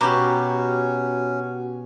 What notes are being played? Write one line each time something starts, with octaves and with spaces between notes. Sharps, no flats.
B2 C#4 F#4 G4 F#5 A#5 B5 D6